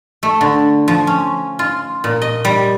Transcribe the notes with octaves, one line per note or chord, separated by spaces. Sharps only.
A3
D3
F3
C#4
F4
A#2
D#5
G3